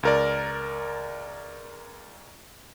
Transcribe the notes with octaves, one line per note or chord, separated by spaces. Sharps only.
C#2 A#4 D5